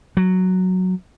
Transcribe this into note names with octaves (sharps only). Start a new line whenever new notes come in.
F#3